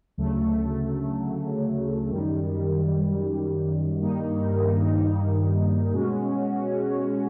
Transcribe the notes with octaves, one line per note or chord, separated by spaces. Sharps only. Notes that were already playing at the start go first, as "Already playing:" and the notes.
D2 C#3 F#3 A3
F#2 D#3 G3
G2 D#3 G3 A#3 D#4
B2 G#3 C#4 F#4